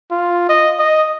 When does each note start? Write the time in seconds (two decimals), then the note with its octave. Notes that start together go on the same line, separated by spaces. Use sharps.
0.11 F4
0.49 D#5
0.79 D#5